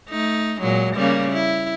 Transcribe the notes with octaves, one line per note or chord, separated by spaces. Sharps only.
A3 D#4
A#2 F#3 G#3
C#3 G3 A#3
E4